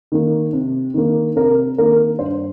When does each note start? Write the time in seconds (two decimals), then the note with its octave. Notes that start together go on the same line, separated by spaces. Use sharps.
0.12 D#3 A#3
0.53 C3
0.94 D#3 A#3
1.36 C3 A#4
1.78 D#3 A#3 A#4
2.19 G2 C5